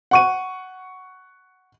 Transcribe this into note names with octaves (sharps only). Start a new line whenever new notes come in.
F#5 C#6 D#7